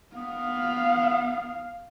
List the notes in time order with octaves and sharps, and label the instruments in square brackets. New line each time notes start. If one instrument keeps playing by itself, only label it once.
[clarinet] B3 [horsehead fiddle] F5